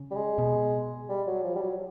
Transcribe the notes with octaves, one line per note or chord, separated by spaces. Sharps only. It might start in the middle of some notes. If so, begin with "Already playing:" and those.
Already playing: C#3
G3
G#3
B2
G3
F#3
F3
G3
F#3